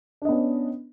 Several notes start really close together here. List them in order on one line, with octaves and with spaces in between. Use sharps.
D4 D#5 B3 C#4